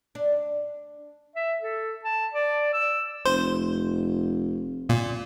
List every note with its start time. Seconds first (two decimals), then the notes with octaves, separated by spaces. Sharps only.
0.15 D4
1.36 E5
1.62 A4
2.04 A5
2.33 D5
2.73 E6
3.26 F1 C5
4.89 A#2